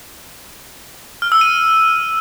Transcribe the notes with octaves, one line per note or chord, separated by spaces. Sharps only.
F6
E6
D#7